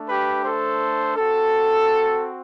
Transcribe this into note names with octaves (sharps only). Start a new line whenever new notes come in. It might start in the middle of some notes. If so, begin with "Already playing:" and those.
Already playing: A3 D4
G4 B4
A4 C5
C4 F#4 A4